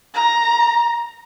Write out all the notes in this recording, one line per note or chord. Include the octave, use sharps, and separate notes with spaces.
A#5